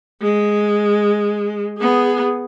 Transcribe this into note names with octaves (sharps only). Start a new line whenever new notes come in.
G#3
B3 G#4